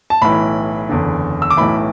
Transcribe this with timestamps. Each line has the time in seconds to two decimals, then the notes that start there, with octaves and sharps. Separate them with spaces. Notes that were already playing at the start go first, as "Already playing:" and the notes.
0.10 A5
0.21 B1 A2 E3 B5
0.89 F#1 E2 D3
1.42 E6
1.50 D6
1.57 B1 A2 E3 B5